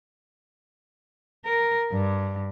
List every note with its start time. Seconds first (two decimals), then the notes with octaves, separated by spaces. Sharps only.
1.45 A#4
1.92 G2